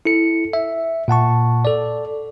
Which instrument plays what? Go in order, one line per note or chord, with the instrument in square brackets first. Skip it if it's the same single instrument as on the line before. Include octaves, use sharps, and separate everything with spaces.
[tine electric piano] E4 A4 C#7
E5
A#2 F#5 A5 C#6
A4 D5